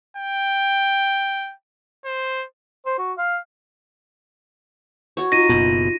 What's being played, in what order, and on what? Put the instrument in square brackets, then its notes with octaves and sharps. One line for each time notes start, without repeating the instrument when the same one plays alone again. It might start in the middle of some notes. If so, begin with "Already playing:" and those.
[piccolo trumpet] G5
C5
[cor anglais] C5
F#4
F5
[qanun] F#4 C#5
[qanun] D#4 [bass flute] F4 [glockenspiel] A#6 D#7
[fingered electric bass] F#1 B2